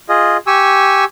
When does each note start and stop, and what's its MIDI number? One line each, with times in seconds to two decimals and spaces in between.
0.09 0.37 65
0.09 0.37 68
0.09 0.37 75
0.47 1.04 67
0.47 1.04 80
0.47 1.04 85
0.47 1.04 88